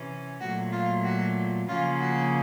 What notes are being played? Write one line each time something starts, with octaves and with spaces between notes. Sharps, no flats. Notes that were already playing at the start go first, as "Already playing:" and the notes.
Already playing: C3 E3 C#4
A#2 F#3 A3 F#4
F4
F#4
C#3 F3 A#3 C#4 F4
F#4